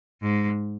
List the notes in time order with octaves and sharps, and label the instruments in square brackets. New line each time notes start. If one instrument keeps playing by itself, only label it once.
[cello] G#2